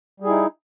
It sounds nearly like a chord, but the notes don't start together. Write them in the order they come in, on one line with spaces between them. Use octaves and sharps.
G3 G#4 E4 D#4